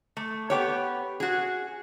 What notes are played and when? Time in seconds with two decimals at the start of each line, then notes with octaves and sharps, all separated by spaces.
0.17 A3
0.50 B3 G4 C#5
1.20 F#4 G#4